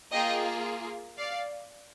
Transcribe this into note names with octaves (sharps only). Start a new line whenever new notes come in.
A#3 F4 G#4 D#5 G5
D5 F5